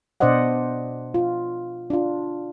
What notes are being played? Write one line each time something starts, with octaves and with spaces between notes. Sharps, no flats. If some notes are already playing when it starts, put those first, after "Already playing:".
B2 D4 C5 D5 D#5 F#5
F4
D4 F4